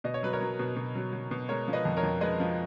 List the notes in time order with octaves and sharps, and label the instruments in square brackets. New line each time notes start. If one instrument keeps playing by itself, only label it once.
[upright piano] B2 D#5
C#5
F#3 B4
A#4 C#5
F#3
B2
B2
F#3
F#3
B2
G#3 A#4 C#5
F3
B4 D#5
F2
A#4 C#5
F2
G#3 B4 D#5
F3